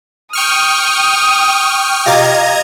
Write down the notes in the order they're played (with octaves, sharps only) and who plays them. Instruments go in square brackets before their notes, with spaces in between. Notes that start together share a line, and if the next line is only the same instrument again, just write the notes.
[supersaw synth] G5 C#6 F6 [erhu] D#6
[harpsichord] F4 G4 D5 [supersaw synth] D#5 A#5 G#6